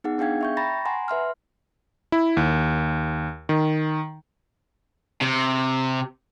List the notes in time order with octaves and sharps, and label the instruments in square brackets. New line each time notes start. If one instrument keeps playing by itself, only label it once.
[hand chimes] B3 D#4 G#4 F#5
B3 D4 G#4 F5 G5 G#6
E5 C#6 G6
G5 A#5 B5 C#6 A6 A#6
F#5 G#5 A#5 C6
B4 E5 C6 F6
[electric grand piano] E4
D#2
D#3
[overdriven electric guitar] C3